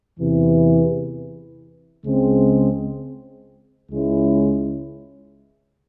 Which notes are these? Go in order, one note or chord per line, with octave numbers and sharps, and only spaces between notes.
E2 C3 E3
C#2 C#3 G#3 C4
C#2 C#3 G#3 C#4 E4